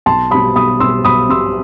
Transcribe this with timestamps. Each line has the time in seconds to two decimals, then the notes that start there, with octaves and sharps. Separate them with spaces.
0.06 B1 A5 C6
0.30 B2 G3 B5 D#6
0.56 B1 B5 D#6
0.80 B2 G3 C6 E6
1.05 B1 B5 D#6
1.29 B2 G3 C6 E6